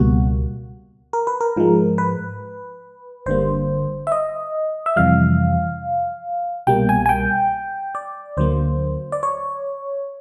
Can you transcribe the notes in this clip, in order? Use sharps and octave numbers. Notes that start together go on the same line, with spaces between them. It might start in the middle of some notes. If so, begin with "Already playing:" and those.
Already playing: C#2 B2 G3 A#3 F#4
A#4
B4
A#4
G#2 F3 G#3
B4
G1 G2 D3 G3 A#3 C5
E5
D#5
E5
F2 C3 E3 G3 F5
C2 B2 G3 A#3 G5
G#5
G#5
G5
D5
D2 D3 F#3 A#3 C5
D5
C#5